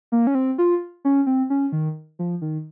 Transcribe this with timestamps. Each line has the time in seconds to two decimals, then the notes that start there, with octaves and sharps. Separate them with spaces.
0.12 A#3
0.27 C#4
0.35 C4
0.58 F4
1.05 C#4
1.26 C4
1.50 C#4
1.72 D#3
2.19 F3
2.42 D#3